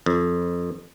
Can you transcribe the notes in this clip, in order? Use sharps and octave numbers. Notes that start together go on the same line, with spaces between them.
F2